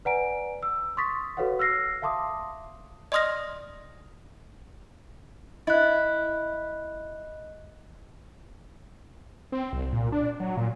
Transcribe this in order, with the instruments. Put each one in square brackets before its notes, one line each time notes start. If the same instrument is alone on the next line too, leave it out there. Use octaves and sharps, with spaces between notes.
[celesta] B4 D5 F#5 G#5 A#5 D7
E6
C6 C#6 D#6 A6 B6
F#4 A4 B4 C#5 F5 F#5
E6 F6 A#6 C7
E5 F5 A5 C6 D6 D#6
[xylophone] D5 D#5 C6 D#6 F6 A#6
[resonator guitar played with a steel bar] E4 [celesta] D#5 F#6
[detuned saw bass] C4
C2
A#2
D4
F#3
A#2